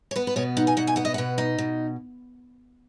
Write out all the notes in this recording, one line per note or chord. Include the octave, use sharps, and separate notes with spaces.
C#5
B3 B4
B4
B2 C#5
D#4 F#5
G#5
B2 F#5
G#5
B3 F#5
D#5
B2 F#5
D#4
B2